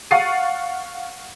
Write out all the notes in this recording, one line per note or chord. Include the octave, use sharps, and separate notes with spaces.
F5 F#5 C#6 A6 C7 D#7